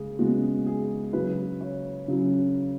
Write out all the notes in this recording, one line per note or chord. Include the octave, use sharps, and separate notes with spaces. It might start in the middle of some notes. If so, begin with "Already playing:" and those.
Already playing: C#3 G#3 G#4
C#3 G#3 B3 F#4
G#4
C#3 F#3 C#4 B4
C#5
C#3 F#3 C#4